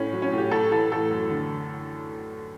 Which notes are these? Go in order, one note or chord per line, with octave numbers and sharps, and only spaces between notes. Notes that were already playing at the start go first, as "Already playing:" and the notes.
Already playing: A2 C#4
F#3
C#4
A2
G4
A2 A4
E3 A4
A2 A4
F#2
D3